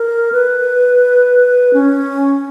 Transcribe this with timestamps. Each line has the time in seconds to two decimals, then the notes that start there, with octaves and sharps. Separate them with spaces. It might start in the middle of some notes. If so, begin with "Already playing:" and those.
Already playing: A#4
0.32 B4
1.73 C#4